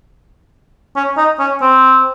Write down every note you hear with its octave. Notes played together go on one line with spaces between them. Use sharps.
C#4
D#4
C#4
C4